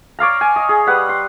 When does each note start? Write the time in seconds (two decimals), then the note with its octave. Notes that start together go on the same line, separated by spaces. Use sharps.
0.19 C#5 D5 F5 A#5
0.41 G#5
0.56 D#5
0.69 G#4
0.87 G3 B4 F#5
1.09 C6